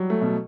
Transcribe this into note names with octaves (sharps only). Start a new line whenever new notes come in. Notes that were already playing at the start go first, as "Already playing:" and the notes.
Already playing: F#3 G3
A3
B2